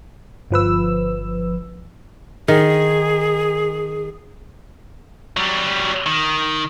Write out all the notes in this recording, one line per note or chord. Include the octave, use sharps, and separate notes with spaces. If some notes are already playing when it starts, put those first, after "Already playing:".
G1 F3 B4 E6
D#3 G#4
F#3 G3
D#3